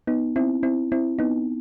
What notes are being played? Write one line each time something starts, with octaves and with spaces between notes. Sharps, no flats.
B3 D#4
C4 E4
C4 E4
C4 E4
B3 D#4